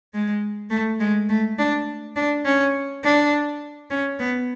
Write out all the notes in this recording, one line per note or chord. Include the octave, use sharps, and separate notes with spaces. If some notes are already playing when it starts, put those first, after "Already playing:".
G#3
A3
G#3
A3
D4
D4
C#4
D4
C#4
B3